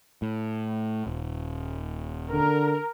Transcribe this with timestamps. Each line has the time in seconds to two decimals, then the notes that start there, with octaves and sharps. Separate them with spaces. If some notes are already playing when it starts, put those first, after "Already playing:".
0.22 A2
1.07 D#1
2.32 D3 A#4